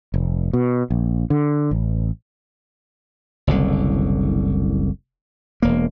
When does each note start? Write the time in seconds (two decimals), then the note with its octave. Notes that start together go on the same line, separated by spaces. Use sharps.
0.14 F1
0.53 B2
0.90 A#1
1.30 D3
1.71 A1
3.47 F#1 C2 D3
5.62 E1 A#3